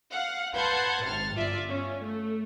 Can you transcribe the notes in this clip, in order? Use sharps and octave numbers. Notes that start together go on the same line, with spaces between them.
F5 F#5
B4 F#5 A5 C6 G6 G#6
G#1 C3 F6 A6
G1 F4 D5 E5
C#4
A3